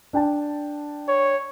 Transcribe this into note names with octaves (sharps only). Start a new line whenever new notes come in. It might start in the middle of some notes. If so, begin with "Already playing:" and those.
D4 G5 A5
C#5